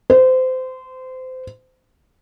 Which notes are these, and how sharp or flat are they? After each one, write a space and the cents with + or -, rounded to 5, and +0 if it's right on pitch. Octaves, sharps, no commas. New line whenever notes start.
C5 -25